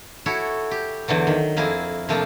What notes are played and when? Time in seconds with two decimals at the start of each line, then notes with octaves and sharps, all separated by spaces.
0.26 E4 F#4 A4 C#5
0.71 G4
1.08 E2 D3 E3 F#3
1.27 D#3
1.57 F2 A#3 E4 G#4
2.09 C3 F3 A3 A#3 D4 F4